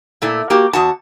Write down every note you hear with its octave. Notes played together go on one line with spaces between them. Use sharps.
A#2 A3 E4
A#3 F#4 G4
E2 F#4 A5